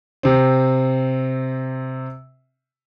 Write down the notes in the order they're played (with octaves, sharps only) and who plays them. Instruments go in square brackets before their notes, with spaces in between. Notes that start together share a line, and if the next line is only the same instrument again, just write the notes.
[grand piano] C3 C4